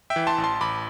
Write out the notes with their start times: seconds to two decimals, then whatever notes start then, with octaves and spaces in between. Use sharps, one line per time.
0.10 E5 G5
0.16 E3
0.27 A5 C6
0.38 A1
0.44 A5 C6
0.61 A1 B5 D6